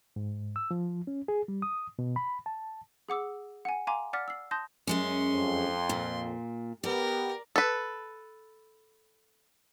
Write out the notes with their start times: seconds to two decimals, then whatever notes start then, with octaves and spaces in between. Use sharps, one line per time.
0.16 G#2
0.56 E6
0.71 F3
1.07 C#4
1.28 G#4
1.48 G3
1.62 D#6
1.99 B2
2.16 B5
2.46 A5
3.09 G#4 F#5 D6 E6
3.65 F#5 G#5
3.87 F5 G#5 A#5 C6 D6
4.13 D5 F#5 D6 F6 A6 B6
4.28 E6 C7
4.51 A5 C6 D#6 G6 A#6
4.87 F#2 G#3 C#4 C6
5.32 F2
5.89 A#2
6.84 B3 G4 A#4 D5
7.56 A4 B4